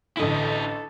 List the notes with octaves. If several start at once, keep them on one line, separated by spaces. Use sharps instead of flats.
A1 D3 E4 A4 D#5 B6